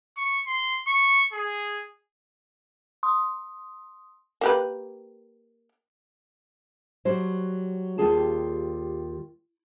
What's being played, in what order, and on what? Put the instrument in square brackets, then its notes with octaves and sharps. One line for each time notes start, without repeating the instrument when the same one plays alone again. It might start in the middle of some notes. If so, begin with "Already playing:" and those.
[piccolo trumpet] C#6
C6
C#6
G#4
[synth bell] C6 D#6
[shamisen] A#3 G4 B4
[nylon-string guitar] F#3 G3 C5
D#2 G3 F4 G#4 A5